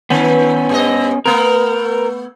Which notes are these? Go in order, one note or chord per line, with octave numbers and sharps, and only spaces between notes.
D#3 B3 C#4
G2 G#4 D#5
A3 B3 A#4